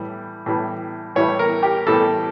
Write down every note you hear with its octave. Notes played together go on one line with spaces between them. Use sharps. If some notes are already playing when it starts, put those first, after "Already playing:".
Already playing: A2 E3 G3
A2 E3 G3
A2 E3 G3 C#5
A#4
G4
A2 E3 G3 A4